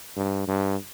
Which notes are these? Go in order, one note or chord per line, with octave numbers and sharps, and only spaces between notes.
G2
G2